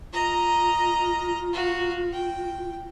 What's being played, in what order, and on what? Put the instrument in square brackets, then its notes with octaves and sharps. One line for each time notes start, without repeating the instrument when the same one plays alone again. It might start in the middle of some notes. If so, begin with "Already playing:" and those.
[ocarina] F4 [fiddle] D#5 A#5
[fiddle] F#4 F5
G5